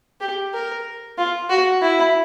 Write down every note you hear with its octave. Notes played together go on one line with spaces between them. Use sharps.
G4
A#4
F4
F#4
E4